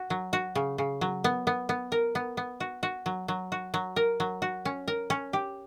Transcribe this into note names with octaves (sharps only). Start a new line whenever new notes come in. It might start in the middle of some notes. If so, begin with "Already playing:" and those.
Already playing: F#4
F#3
F#4
C#3
C#3
F#3
B3
B3
B3
A#4
B3
B3
F#4
F#4
F#3
F#3
F#4
F#3
A#4
F#3
F#4
C#4
A#4
C#4
G4